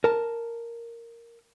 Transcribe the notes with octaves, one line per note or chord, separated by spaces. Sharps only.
A#4 A5